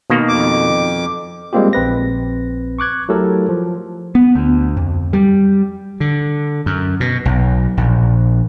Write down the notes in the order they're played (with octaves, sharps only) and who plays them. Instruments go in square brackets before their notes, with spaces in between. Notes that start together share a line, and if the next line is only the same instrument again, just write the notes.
[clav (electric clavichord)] B2 D#3 A#3
[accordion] F2 D6
[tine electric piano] G3 G#3 A#3 C4 F4 G4
A#1 C4 B4 A#6
C#6 D6 F#6 G#6
F#3 A3 E4 G4 A4 A#4
F3
[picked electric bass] B3
D2
F2
G3
[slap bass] D3
F#2
B2
B1
A#1